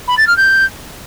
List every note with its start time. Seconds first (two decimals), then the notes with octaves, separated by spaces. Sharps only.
0.08 B5
0.17 A6
0.27 F6
0.37 G6